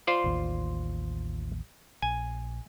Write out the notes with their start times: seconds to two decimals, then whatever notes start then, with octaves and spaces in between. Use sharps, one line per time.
0.07 F4 C5 D5
0.24 A1 D#2
2.02 A#1 G#5